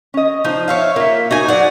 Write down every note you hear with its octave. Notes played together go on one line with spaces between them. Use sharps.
C#4 D#5
F3 D#4 C5
C#5 E5 F5
A#3 F4 E5
D#4 F#4 G#5
F#3 D5 F#5